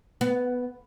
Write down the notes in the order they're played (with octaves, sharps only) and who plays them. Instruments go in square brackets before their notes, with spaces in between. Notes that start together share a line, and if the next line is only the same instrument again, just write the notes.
[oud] B3